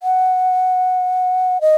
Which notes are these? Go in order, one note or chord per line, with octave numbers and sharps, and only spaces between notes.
F#5
D#5